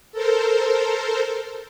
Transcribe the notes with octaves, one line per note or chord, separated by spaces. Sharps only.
A4 A#4 C5